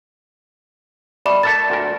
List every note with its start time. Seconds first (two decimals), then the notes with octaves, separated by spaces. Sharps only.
1.26 B2 D5 E5 B5 D6
1.43 A3 A4 A#4 A6 E7
1.70 D2 A#2 A#4